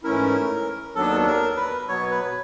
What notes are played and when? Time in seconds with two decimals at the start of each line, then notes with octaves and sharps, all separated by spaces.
0.04 G#2 E3 A3 C#4 E4 A#4
0.95 D#2 D#3 F#3 B3 D4 A4
1.27 A#4
1.57 B4
1.88 B2 F#3 B3 C#5
2.11 B4